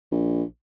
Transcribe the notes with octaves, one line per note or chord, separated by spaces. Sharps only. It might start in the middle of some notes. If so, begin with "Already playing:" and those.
A#1